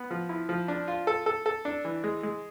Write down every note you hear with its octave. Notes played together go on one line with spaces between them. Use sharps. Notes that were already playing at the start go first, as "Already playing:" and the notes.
Already playing: B3
F3
E4
F3
D4
F4
A4
A4
A4
D4
E3
G#3
G#3